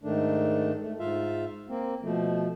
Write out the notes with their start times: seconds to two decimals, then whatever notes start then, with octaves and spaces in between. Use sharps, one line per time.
0.03 G#2 D#3 A3 D4
0.82 A3
0.99 G#2 F4 E5 F5
1.69 A#3 C4
2.03 B2 F3 A3